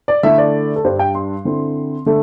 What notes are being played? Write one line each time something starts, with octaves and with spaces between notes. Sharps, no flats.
D5
D3 A3 E4 E5
D5
A4
G2 G3 D4 C5
G5
C6
D3 C4 E4
D3 A3